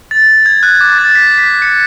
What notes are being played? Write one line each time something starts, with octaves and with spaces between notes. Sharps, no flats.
A6
G#6
F#6
D6
A6
B6
B6
C#7